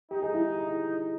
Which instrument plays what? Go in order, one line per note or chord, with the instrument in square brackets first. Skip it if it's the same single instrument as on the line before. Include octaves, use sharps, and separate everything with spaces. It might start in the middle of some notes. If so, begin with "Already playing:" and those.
[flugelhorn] D#4 [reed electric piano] G4
[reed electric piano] G#4
E4